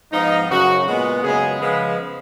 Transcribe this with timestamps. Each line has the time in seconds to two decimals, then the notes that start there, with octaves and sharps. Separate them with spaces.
0.12 G#2 F3 B3 D#4
0.49 F#2 C#3 F#3 F#4
0.87 A#2 G#3 B3
1.23 F#2 C#3 G#3 B3 G#4
1.60 C#3 F3 G#3 B3 B4